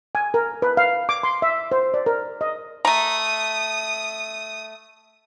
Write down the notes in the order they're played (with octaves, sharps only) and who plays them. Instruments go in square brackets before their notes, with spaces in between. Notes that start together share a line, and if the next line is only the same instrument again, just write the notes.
[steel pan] G#5
A#4
B4
F5
D6
C6
E5
C5
D5
A#4
D#5
[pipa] A3 A#5 [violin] D#6